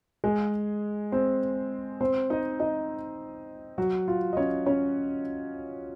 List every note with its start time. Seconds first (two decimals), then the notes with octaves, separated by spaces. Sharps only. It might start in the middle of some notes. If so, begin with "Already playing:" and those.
0.24 G#3 G#4
1.12 C4 C5
2.01 C4 C5
2.30 D#4 D#5
2.60 D#4 D#5
3.78 F#3 F#4
4.08 F4
4.33 D#5
4.37 C#4 C#5
4.66 C#4 C#5